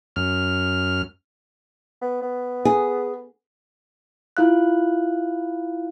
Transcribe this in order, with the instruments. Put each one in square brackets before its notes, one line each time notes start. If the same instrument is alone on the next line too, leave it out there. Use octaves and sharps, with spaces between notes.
[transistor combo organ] F#2 F6
[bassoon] B3
B3
[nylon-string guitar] G#4
[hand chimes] E4 F4 F5 F#6